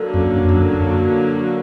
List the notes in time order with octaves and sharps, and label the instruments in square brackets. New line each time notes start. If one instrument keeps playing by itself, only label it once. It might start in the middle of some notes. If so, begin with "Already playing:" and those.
Already playing: [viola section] D3 F#3 A#3
[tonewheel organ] F#2
F#2